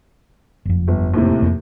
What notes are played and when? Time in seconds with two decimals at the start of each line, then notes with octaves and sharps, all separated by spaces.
0.65 F#1 F2
0.88 G1
1.14 D#2 A2 C3
1.42 F2 A#3